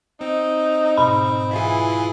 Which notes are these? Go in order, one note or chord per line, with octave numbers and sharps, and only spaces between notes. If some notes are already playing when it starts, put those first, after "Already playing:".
C4 D#4
G#2 B2 B5
E3 E4 F4 G#4